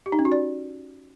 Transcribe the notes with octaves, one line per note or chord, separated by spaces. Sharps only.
G4
D#4
C#4
F#4
D5